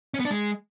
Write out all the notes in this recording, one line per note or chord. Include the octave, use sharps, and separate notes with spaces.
C#4
B3
D4
G#3